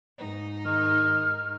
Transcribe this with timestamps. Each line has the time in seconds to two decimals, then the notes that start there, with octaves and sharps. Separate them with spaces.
0.17 G#2 D#4
0.65 D#3 F6